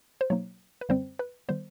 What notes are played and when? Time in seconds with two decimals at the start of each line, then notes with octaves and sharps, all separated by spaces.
0.21 C5
0.30 B2 F#3 A#3 D#4 C#5
0.81 B4
0.89 F#2 D3 G3 C4 C5
1.19 B4
1.48 D#3 G3 B3 C5